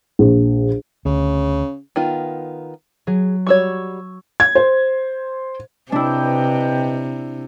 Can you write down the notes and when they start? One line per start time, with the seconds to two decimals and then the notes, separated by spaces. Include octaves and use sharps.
0.19 A#1
1.05 D2 C#3
1.96 D#3 B3 F4
3.07 F#3 G#4
3.47 G3 F#4 C#5 C#6 E6 G#6
4.40 G#6
4.55 C5
5.92 C3 D4 E4 B4 D#5 G5